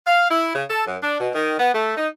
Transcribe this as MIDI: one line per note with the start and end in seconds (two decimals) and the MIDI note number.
0.07 0.29 77
0.30 0.52 64
0.54 0.64 49
0.69 0.86 69
0.86 0.96 42
1.02 1.20 62
1.20 1.29 47
1.35 1.59 51
1.59 1.72 59
1.74 1.93 57
1.97 2.08 63